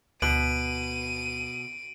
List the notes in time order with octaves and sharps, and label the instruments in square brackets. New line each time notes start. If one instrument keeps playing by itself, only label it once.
[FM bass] D2 [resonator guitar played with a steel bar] B2 [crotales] D7 F#7 [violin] D#7